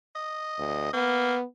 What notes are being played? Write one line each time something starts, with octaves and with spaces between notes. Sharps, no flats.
D#5
D2
A#3 B3